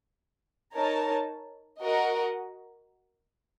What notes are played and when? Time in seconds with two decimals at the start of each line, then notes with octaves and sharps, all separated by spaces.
0.73 D#4 A#4 C#5 A5
1.81 F#4 A#4 D#5 F#5